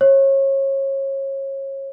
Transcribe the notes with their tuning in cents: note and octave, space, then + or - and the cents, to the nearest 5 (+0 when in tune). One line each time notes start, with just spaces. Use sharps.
C#5 -30